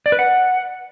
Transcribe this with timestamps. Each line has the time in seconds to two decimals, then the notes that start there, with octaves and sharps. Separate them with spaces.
0.06 D5
0.12 B4
0.19 F#5